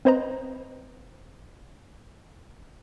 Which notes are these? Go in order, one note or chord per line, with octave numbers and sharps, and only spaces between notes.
C4 B4 C5 D#5 A#5